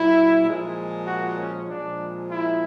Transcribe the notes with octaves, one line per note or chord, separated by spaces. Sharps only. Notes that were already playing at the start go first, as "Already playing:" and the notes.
Already playing: A#2 F#3 E4
A#2 F3 G#3
F#4
C#4
A#2 F3 G#3 D4
E4